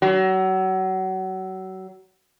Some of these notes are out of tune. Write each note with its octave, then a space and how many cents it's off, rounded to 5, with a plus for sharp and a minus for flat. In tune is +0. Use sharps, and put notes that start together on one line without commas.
F#3 +30